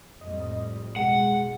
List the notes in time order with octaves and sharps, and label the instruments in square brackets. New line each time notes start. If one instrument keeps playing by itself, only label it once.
[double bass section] F2 A2 G3 [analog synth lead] D#5
[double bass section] B1 [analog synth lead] G#3 [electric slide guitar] F#5